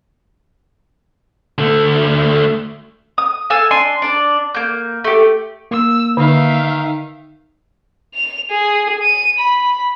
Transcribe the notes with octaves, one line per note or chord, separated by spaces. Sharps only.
D3 A3
D#6
A4 F5 G#5 E6
D4 G#5 C6
D4 D5
A#3 G6
A3 G4
A#3 E6
D3 D#3 E5 F5
F7
G#4
D#7
B5